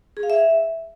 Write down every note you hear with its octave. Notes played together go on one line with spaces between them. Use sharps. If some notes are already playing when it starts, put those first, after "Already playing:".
G#4
F5
E5